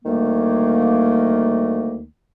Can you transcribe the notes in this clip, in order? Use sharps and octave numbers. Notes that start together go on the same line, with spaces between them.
D2 D#3 G3 A3 A#3